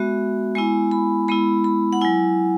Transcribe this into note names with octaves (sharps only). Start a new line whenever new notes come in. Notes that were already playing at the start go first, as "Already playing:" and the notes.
Already playing: G#3 B3 F#4 E5
G#3 B3 E4 G#5
B5
G#3 B3 E4 B5
B5
F#5
F#3 E4 G#5